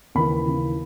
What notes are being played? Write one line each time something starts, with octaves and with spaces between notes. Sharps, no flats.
D#2 C#3 E3 B5
D#2 C#3 E3